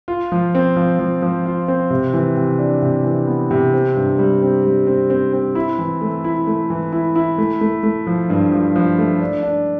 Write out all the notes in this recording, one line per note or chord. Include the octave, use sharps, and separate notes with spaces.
F4
F3
C4
F3
F3
F3
F4
C4
C3
E3
C3
D4
C3
E3
B3
C3
C4
G2
G3
C4
G3
C4
C4
C4
E4
E3
A3
E4
A3
E3
E4
E4
A3
A3
A3
F3
G2
F3
F3
A3
D4
D4